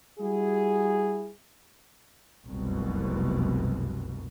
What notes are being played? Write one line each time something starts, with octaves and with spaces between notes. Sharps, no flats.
G3 E4 F#4 G#4
F1 C2 F#2 B2